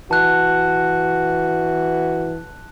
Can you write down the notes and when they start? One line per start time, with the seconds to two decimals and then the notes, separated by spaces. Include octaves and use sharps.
0.11 E3 F#4 A5 F#6